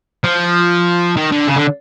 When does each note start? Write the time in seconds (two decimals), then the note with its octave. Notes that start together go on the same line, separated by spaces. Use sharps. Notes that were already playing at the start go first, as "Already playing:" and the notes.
0.24 F3
1.16 D#3
1.32 D3
1.47 C#3
1.56 D3